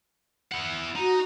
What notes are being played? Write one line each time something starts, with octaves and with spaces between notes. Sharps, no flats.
E4 F#5
D#4 F#4